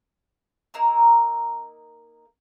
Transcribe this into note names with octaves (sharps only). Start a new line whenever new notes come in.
A#3 D#4 A#4 E6